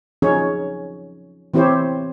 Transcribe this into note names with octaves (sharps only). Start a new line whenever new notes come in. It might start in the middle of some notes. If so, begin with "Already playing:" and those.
F3 C#4 D#4 G#4 C#5
E3 C4 E4 G4 C5 C#5